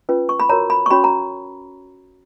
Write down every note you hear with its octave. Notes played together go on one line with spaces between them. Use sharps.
C#4 F4 B4
C#6
B5
F#4 A#4 C#5 A#5
B5
C#6
C#4 F#4 C#5 B5
A#5